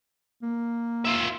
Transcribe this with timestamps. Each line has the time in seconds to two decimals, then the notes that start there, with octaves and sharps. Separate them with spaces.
0.42 A#3
1.05 F4 E5